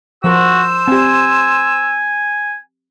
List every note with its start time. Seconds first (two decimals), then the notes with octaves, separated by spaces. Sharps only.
0.24 F3 F#4 A#4 C5 E6
0.88 C4 G4 G#5